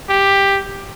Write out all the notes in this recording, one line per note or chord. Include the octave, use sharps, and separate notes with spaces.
G4